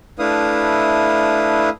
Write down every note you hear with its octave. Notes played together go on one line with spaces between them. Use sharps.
A3 D4 E4 B4 F5 D#6